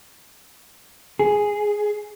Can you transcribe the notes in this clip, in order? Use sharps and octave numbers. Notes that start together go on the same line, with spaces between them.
G#4